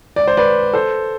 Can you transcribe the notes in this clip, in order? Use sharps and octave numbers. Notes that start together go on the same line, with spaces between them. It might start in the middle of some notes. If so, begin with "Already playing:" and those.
D5
C5
B4 D5
A4 C5